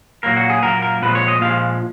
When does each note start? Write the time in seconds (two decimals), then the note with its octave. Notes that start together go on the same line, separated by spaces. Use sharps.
0.23 A#2 F#3 A#3 A#4
0.37 F#4
0.50 G#4
0.63 A#2 F#3 A#3 A#4
0.82 A#4
1.02 A#2 F3 G#3 B4
1.15 C#5
1.28 D#5
1.41 A#2 F3 G#3 F5